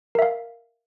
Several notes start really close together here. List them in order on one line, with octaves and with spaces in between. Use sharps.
A#4 E5 F5